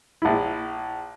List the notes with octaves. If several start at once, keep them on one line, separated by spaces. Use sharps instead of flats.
A#1 E4